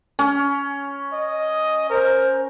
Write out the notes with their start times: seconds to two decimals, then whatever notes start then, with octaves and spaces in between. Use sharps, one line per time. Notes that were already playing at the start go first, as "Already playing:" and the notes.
0.19 C#4
1.13 D#5
1.90 A#4 C5